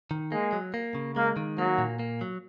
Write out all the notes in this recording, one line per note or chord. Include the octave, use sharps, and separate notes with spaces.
D#3
G#3 A#3
F#3
A#3
C#3
G#3 A#3
D#3
F#3 A#3
A#2
A#3
F#3